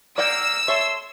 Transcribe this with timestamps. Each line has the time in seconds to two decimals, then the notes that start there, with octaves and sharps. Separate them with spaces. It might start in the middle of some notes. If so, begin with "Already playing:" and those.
0.18 A#3 D5 F#5 G5 E6
0.68 A4 C#5 E5 C6